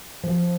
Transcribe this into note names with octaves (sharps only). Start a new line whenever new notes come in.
F3